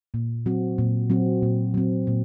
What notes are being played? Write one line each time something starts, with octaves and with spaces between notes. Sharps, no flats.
A#2
F#3 C4 F#4
A#2
F#3 C4 F#4
A#2
F#3 C4
A#2